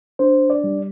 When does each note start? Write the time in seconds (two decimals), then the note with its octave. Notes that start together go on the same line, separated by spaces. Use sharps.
0.19 D4 C5
0.50 D5
0.64 G3